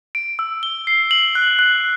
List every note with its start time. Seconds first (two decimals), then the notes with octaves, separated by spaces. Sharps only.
0.15 D7
0.39 E6
0.63 G7
0.87 C7
1.11 F#7
1.35 F#6
1.59 F#6